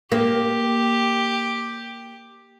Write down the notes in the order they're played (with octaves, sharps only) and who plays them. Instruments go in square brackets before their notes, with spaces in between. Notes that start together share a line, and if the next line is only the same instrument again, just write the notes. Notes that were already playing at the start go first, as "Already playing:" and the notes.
[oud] A#3 [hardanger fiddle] G4